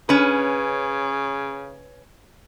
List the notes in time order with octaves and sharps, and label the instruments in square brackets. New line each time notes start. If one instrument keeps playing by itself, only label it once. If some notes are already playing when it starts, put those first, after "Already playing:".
[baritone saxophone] C#3 [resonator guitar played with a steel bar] C#4 B4